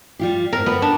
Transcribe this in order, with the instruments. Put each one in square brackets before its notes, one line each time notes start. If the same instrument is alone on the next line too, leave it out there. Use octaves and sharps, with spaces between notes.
[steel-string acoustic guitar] G3 F4 G4
[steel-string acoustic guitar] D#2 G#2 [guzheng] A#4
[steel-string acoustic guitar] D2 G3 [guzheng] B3
[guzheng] D4